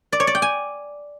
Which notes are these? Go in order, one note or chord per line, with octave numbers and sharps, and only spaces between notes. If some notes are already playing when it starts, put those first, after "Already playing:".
D5
C#5
D5
G5
G#5